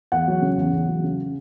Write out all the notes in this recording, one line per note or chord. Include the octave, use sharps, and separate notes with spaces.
E2 F#5
F#3
C#3
E2
E2
F#3
C#3